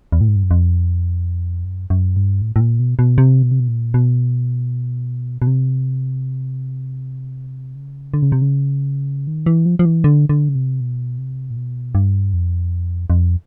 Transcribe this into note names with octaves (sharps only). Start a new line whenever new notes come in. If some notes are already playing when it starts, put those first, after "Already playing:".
E2
A2
G#2
G2
F#2
F2
F#2
F#2
G2
A2
A2
A#2
B2
B2
C3
B2
C3
B2
A#2
B2
B2
C3
C#3
D3
C#3
C3
C#3
D#3
E3
F3
F3
E3
D3
D3
C#3
C3
B2
C3
A#2
B2
G2
F2
F2